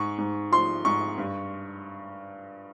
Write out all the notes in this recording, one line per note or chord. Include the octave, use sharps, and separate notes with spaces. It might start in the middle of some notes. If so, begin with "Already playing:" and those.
Already playing: G#2 C#6
G#2
F3 C6
G#2 C#6
G2